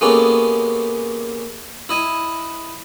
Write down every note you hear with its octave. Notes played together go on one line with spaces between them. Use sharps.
G#3 A#3 B3 C#4 G4 A4
E4 D#5 G#5